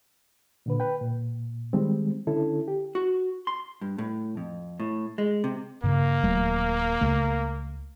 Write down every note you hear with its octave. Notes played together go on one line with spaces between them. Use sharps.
A#2 D3 B4
B4 G5
A#2
D#3 G3 G#3 C4
D3 C#4 E4 A4
G4
F#4
C6
G2
A2
F2
A2
G#3
C3
G2 C#3 A#3
D#1 F#3 A3
C#2 C#3 A3